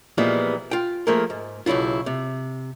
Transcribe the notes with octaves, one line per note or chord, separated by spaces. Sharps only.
A#2 E3 F3 G3 G#3 B3
F4 G5
F3 A3 A#3 G#4 A#4
G#2
B1 C#3 F#3 E4 F4
C3